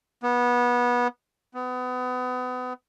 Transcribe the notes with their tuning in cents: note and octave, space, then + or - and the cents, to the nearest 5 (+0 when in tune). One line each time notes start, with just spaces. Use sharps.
B3 -20
B3 +30